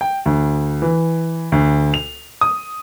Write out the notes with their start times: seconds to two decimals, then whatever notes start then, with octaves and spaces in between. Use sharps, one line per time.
0.01 G5
0.26 D2
0.82 E3
1.52 D2
1.94 F7
2.41 D#6